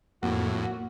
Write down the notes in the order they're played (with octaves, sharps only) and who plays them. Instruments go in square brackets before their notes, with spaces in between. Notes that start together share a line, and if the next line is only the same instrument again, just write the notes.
[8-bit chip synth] F2 A2 [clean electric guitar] A#3 [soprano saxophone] F#4